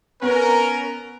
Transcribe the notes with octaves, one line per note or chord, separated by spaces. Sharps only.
B3 C#4 A#4